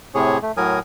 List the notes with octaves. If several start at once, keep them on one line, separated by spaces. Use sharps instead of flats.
A2 C3 G#4 C#5
A3
A2 F#3 A#4 G#5 D#6